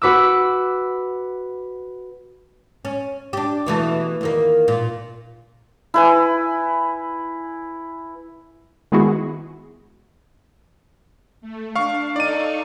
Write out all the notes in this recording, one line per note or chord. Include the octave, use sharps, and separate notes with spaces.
F#4 B4 D6 E6
C#4
D4 G4
B2 E3 A3
E2 D#3 A#3
A#2
E4 B4 G#5
D#3 G#3 B3 E4 F#4 G#4
A3
D4 F5 C#6
D#4 A4 D5 F5 C#6 D#7